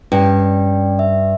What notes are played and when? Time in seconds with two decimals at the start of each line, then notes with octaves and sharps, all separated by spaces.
0.12 G2 C#4 D5 G5
0.99 E5